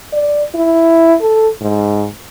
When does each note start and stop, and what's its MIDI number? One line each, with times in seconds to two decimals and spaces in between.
0.13 0.44 74
0.55 1.14 64
1.21 1.47 69
1.61 2.07 44